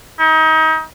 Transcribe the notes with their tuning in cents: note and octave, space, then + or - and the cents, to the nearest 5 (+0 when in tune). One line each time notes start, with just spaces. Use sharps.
D#4 +30